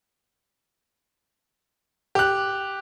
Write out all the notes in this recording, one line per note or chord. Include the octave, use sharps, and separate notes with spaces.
G4 F#6